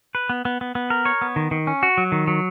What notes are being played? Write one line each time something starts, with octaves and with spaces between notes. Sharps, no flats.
B4
B3
B3
B3
B3
A#4
C#5
B3
D#3
D#3
C#4
F#4
F#3
D#3
F#3